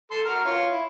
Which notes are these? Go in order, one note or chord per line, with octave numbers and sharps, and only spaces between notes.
A4 C6
F#4 A#4 F6
F4 C#5
E4